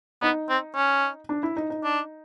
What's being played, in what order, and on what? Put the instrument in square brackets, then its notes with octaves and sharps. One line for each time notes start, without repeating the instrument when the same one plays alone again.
[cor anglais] B3 [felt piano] D#4
[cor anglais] C4
C#4
[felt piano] D4
E4
D#4
D#4
[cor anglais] D4